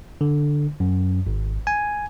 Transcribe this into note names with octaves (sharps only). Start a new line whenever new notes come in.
D3
F#2
G#1
G#5